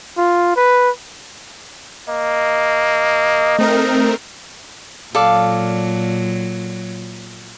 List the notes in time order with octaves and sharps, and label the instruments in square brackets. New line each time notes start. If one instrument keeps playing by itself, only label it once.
[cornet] F4
B4
[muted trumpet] A#3 [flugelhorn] D#5
[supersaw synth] A3 C4 A#4 [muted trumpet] D#4
[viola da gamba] A#2 F#3 [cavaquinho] A4 D5 F5